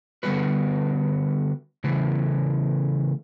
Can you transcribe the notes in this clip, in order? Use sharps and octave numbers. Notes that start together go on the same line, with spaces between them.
D3 G3 B3 F#4 B4
C#3 E3 A3